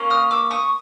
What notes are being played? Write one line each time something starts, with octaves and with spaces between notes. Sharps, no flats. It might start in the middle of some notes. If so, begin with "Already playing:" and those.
Already playing: A#3 C#4
D#6 F6
D6 E6
C#6 D#6